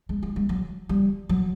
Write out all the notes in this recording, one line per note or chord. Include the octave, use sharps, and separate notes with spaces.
G#3
G#3
G#3
F#3
G3
F#3